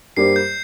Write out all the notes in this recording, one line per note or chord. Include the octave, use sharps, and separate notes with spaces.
G2 G3 A#3 G4 C5 C7
G6